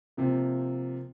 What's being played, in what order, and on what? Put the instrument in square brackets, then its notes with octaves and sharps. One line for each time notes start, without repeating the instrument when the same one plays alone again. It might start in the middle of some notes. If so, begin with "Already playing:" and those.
[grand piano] C3 F3 A#3